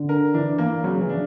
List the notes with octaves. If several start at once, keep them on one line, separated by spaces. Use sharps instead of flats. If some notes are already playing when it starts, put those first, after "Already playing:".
Already playing: D3
A#4
E3 D4
A#3
C#3 F#3
E3
D4